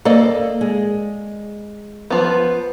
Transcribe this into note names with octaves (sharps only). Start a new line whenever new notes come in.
A#3 A4 D5 D#5
G#3
F3 B3